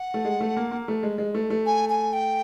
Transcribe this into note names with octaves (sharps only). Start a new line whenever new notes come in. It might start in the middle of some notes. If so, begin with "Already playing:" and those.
Already playing: F#5
A3
G#3
A3
A#3
A#3
A3
G#3
G#3
A3
A3
G#5
G#5
G5